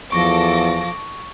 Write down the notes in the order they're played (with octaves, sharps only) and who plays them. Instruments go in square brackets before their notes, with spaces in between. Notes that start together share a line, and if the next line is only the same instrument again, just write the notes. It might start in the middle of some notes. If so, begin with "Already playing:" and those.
[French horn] E2 [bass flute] F3 [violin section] A4 D6 A#6 [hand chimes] C#6